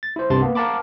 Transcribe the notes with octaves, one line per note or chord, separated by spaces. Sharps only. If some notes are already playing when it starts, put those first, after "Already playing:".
A6
E4 C5
C2 G2 C3 A5 C6 A6
A#3 B3
A#4 F5 F#5 A5 B5 D6